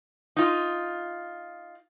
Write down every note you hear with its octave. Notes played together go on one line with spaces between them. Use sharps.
D#4 F4